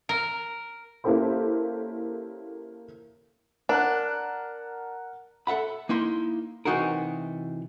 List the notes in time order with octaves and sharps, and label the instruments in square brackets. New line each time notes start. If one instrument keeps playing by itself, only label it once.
[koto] A#4
[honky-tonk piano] A#3 C#4 E4 G4 A4 C5
[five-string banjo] D4 [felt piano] A#4 F#5 F#6
[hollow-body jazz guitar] A4 E5 F#5 B5
A#3 D#4 E4 C6
C3 E3 D#4 F#4 G#4 A#4